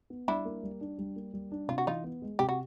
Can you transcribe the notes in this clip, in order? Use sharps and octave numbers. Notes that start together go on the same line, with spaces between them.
B3
G3 D4 E4
A#3
G3
D4
G3
A#3
G3
D4
C3 F4
F#4
E3 D#4 F4
B3
G#3
C3 G4
F#4